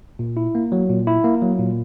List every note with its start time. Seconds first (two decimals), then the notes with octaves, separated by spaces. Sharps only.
0.19 A#2
0.37 E4
0.55 A#3
0.72 F#3
0.90 A#2
1.07 E4
1.24 A#3
1.42 F#3
1.59 A#2